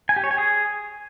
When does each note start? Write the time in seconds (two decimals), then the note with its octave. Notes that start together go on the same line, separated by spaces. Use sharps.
0.09 G#5
0.16 G4
0.24 C#5
0.31 G#5
0.38 G#4